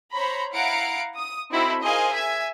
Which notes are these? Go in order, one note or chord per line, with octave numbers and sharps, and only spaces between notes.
C5 C#5 A#5 B5
E4 F5 F#5 A#5 C7 D7
D#6
C4 D#4 E4 F#4 A4 C5
G#4 A#4 C5 D#5 F5 G#5
E5 G#5 G#6